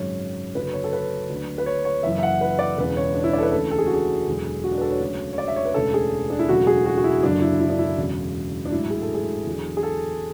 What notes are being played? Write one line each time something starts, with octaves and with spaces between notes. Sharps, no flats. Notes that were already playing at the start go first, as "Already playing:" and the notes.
Already playing: G#1 F#2 C#3 F#3 C#5
F#1 F#2 D3 F#3 B4
C#5
A4
B4
D2 D3 F#3
B4
C#5
C#5
F#1 F#2 E3 E5
E5
F#5
B4
D5
E1 E2 C#3 B4
C#5
D4
E4
D5
A4
B4
D2 C#3 E3 A4
A4
G#4
F#4
G#4
E1 E2 D3 F#3
F#4
D4
B4
A4
C#5
D2 C#3 F#3
C#5
D5
E5
C#5
B4
E1 D2 C#3 A4
G#4
D4
E4
E1 D2 C#3 F#3 F#4
G#4
F#4
F#4
E4
F#1 F#2 D3 F#3 D4
E4
E4
D4
E4
E1 E2 C#3 F#3
D4
A1 G#2 F#3 E4
G#4
A4
G#4
E2 D3 F#3
G#4
A4